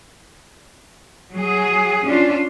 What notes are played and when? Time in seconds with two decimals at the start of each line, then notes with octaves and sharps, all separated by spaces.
1.32 F#3 G#4
2.06 C#4 D4 F4